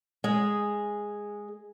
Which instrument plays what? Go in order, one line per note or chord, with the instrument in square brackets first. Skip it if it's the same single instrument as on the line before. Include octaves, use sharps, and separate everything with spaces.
[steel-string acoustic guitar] G#3 G#4